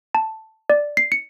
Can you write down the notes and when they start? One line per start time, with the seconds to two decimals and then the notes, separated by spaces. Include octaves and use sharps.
0.15 A5
0.70 D5
0.97 C7
1.12 C#7